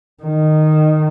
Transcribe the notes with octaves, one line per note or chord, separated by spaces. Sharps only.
D#3